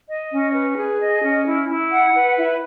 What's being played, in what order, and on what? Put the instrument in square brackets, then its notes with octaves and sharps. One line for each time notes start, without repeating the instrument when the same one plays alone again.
[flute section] D#5
C#4
B4
G#4
D#5
C#4
E4
E4
F#5
B4
E4